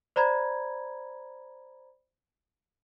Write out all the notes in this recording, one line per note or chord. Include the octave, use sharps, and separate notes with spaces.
C5 D5 A#5 B5 G#6